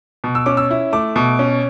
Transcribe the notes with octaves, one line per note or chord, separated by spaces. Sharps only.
B2
E6
C#4 D6
E6
E4
A3 D6
B2
C#4